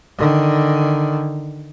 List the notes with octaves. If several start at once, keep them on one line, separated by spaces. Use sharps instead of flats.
D3 D#3